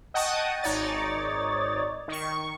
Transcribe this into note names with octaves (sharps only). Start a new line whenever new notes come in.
D#5 F#5 G5 A5 C#6 D#6
G#1 D#4 C#5 D5 A6
D#3 C#6